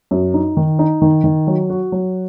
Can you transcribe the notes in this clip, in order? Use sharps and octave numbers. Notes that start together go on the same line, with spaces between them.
F#2
D#4
D#3
D#4
D#3
D#3
F#3
F#4
F#3